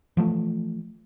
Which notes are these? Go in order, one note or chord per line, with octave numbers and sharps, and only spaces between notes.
E3 F3 A3